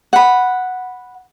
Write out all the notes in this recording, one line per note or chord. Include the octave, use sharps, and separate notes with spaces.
F#5 B5